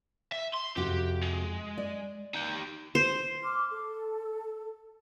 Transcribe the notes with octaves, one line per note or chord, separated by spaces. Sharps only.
E5
C6
F2 C3 F#4 G4
G#3
D5
D#4 G4
C5
C6 D6 F6
A4